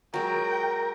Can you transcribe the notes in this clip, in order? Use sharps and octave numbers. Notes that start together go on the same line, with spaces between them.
F#3 G#3 A#4 G5